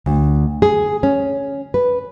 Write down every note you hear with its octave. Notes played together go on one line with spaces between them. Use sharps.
D2
G#4
C#4
B4